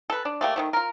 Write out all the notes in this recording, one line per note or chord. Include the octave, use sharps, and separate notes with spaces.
A4 B4
D4
A3 A#3 G4
D#3 F#3 A3
F4 A#4